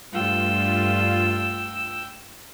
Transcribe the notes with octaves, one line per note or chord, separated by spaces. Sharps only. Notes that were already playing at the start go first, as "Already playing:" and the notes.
G2 A3 F4 G5 E6